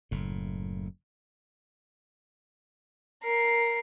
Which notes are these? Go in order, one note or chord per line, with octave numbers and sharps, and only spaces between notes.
F#1 A2
A#4 C7